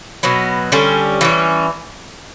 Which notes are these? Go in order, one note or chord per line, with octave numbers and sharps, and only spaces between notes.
B2 F#3 B3
D3 G3 C#4 G4
E3 G3 C#4